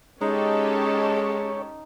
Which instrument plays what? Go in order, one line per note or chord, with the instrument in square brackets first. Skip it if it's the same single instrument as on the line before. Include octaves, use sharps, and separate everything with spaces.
[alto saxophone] G#3 [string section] C#4 G4 A4 [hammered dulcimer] D#4 [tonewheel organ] C#5